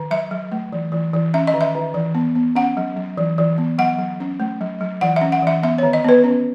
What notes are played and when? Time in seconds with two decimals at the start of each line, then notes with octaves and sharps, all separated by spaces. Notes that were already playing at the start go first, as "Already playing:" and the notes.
Already playing: D#3
0.11 F#3 E5
0.31 F#3
0.52 A3
0.73 E3
0.92 E3
1.13 E3
1.34 C#4 E5
1.47 D#5
1.54 D#3
1.61 E5
1.75 D#3
1.94 E3
2.15 B3
2.35 B3
2.56 C#4 F#5
2.77 F#3
2.97 F#3
3.17 E3
3.38 E3
3.58 B3
3.78 F#3 F#5
3.99 F#3
4.20 C#4
4.40 A3
4.61 F#3
4.81 F#3
5.01 E3 F#5
5.16 E5
5.21 C#4
5.32 F#5
5.42 E3 E5
5.63 B3 E5
5.78 D#3 C#5
5.93 D#5
6.04 B3 B4
6.24 C#4